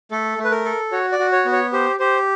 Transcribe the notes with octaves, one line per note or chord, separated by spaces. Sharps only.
A3 A4
A3
B4
A#4
A4
F#4 C#5
D5
F#4
C#5
B3
C#5
G4 C5
G4 C5